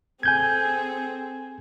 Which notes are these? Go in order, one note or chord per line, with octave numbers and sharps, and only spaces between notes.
C4 G#4 A4 G#5 G6 G#6